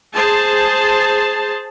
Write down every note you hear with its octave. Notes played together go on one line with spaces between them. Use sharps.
G#4 C5 A5